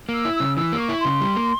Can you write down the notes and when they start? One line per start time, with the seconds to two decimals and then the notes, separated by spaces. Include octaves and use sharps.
0.09 A#3 E6
0.25 E4
0.35 E6
0.40 C#3
0.56 E3 E6
0.72 A#3
0.78 C#6
0.89 E4
1.00 C6
1.05 C#3
1.21 G3
1.36 A#3